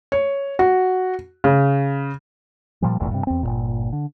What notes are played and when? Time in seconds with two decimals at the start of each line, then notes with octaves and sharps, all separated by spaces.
0.12 C#5
0.59 F#4
1.44 C#3
2.82 A#2 F3 G3
3.00 F1 A#1 E2 A2
3.11 G2 C3
3.27 E2 C4
3.43 G1 C2 A#2
3.93 D3